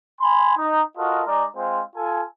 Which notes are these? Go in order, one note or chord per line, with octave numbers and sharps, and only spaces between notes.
G#5 B5 C6
D#4
F4 F#4 A4 A#4 D#5
G#3 D#4 D5 A#5
G#3 C4 F4 C5
F4 A4 G#5